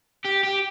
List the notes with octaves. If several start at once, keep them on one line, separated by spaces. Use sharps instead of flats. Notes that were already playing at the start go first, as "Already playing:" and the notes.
G4
G4